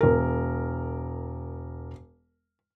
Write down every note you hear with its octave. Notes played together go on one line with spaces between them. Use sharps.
E1 A#4